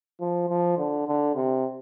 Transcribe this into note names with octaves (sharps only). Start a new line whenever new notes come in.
F3
F3
D3
D3
C3